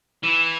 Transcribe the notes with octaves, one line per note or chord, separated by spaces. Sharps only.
E3